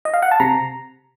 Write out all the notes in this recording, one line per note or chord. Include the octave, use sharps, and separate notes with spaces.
D#5
F5
F#5
A5
C3 A#5